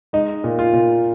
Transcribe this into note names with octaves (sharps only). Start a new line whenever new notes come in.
G#3 D#4
A#2
F4
A#2